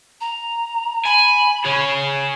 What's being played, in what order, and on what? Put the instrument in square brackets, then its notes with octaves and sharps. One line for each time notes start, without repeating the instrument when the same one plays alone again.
[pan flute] A#5
[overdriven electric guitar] G#5 [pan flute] B5
[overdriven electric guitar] G#4 C#5